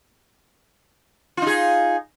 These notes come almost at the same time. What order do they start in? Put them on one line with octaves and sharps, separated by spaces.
F4 D#4 G#4